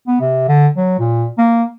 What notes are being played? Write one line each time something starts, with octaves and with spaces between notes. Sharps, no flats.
B3
C3
D3
F#3
A#2
A#3